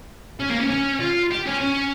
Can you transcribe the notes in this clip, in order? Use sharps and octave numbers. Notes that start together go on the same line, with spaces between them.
C#4
A#3
C#4
C#4
F4
G4
C#4
C#4